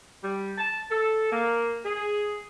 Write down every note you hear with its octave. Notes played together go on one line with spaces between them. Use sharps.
G3
A5
A4
A#3
G#4